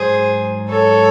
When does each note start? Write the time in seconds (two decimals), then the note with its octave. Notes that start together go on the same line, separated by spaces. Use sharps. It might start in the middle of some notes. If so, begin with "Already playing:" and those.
Already playing: G#2 F#3 G#4 C5
0.70 A4 C#5